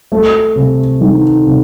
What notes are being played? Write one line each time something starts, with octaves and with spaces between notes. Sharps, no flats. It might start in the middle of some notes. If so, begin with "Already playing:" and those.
A3
C3
D#3
C3